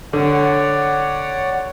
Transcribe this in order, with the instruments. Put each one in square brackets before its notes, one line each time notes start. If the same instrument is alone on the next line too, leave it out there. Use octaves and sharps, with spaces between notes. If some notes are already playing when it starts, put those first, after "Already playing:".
[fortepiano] D3 [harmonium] C#5 D5 F#5